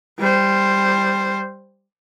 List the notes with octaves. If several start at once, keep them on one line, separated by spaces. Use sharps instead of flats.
G3 C5